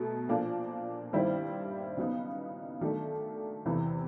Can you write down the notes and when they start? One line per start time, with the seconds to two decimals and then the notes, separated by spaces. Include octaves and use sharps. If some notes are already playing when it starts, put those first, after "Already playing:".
Already playing: B2 F#3 A3
0.29 A#2 F3 A#3 D4
1.13 G2 D#3 G3 C4 E4
1.97 C#3 F#3 B3 D#4
2.81 D#3 F#3 A3 D4
3.66 E2 C3 E3